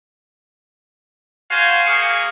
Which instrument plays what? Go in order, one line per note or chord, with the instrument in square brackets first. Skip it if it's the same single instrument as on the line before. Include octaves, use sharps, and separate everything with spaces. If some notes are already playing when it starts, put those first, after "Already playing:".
[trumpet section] F#4 C5 F5 G#5
A#3 G#4 F5 C#6